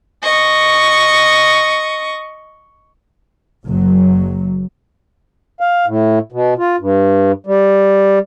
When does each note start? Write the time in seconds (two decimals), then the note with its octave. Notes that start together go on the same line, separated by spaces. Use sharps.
0.23 D#5 C#6
3.66 F#1 F#3
5.60 F5
5.86 A2
6.32 B2
6.58 F4
6.79 G2
7.46 G3